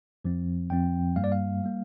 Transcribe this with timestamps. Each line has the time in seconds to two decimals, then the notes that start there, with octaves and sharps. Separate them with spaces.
0.25 F2 F3 C4
0.70 F2 F3 C4 G5
1.16 G2 G3 A#3 F5
1.24 D5
1.32 F5
1.64 G3 A#3